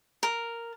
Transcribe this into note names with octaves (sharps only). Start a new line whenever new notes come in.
A#4